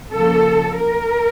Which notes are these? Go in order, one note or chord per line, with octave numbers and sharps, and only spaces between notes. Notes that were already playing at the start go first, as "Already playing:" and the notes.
C#3 F3 A#3 A4
A#4